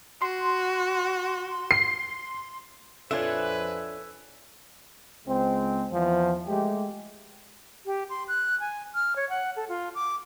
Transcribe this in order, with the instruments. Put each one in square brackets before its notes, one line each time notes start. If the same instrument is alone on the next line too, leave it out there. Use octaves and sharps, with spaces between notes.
[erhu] F#4 [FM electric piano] C6
[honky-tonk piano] C7
[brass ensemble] F2 B4 [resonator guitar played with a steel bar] D4 F4 [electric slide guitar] A4 C#5 [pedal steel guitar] E5 G#5
[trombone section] C#2 G#3 C4
E2 F3
G#3 A3 G4
[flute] G4
C6
F#6
G#5
F6
C#5
F#5
A4
F4
D6